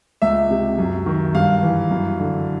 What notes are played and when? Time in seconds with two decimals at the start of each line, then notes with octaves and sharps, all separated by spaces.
0.22 C#2 E5
0.50 C3
0.78 F#2
1.06 D#3
1.34 G2 F5
1.63 E3
1.91 F#2
2.19 D3